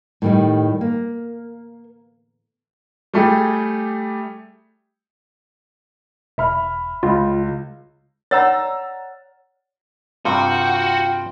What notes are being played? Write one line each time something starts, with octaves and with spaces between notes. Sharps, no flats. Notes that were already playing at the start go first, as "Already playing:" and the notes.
A2 D#3 G3
A#3
G3 A3 G4 G#4
E1 E5 B5 F6
C#2 F4
C#5 D5 F#5 A#5 E6 A6
G2 C3 F4 F#4 G5